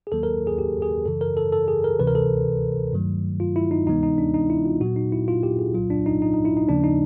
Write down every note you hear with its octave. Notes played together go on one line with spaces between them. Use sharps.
G#4
D#2 D#3 F#3 A#3 A4
A#4
G#4
G4
G#4
F#2 C#3 E3 A4
A#4
A4
A4
G#4
A#4
D2 C3 E3 B4
A#4
A4
G2 D#3 F#3 A3
F4
E4
D#4
D2 C3 E3 G#3 B3 D#4
D#4
D4
D#4
E4
F4
A#2 F#3 B3 F#4
D#4
E4
F4
G4
G#4
C2 A#2 F#3 F4
D4
D#4
D#4
D#4
E4
D#4
D#2 C#3 F3 A#3 C#4 D4
D#4